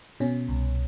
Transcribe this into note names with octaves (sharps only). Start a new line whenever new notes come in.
B2 C#4
C2